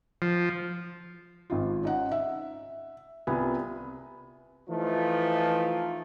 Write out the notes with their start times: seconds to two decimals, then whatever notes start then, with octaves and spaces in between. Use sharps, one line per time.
0.22 F3
1.50 G#1 F4
1.83 C#4 D#4 F#5
2.12 E5
3.27 C2 B3 F4 G#5
4.68 E3 F3 A3 D#4 F4